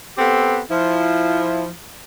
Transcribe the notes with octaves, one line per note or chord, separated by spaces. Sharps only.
B3 C4 G4 A4
F3 E4